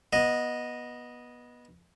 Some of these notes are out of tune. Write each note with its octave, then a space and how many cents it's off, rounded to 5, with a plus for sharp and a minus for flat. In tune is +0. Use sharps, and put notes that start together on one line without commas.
B3 -20 D#5 +0